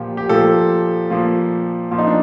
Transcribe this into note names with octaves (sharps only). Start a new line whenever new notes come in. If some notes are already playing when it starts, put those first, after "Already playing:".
Already playing: A#2 F3 G4
G4
A#2 F3 A4
A#2 F3
A#2 F3 F4
D#4
D4